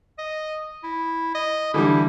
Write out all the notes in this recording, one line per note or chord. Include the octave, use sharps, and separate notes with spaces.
D#5
E4
D#5
D3 E3 G3 E4